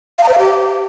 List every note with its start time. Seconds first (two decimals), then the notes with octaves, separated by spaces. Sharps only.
0.18 F5
0.23 A#5
0.28 C5
0.33 F5
0.39 G4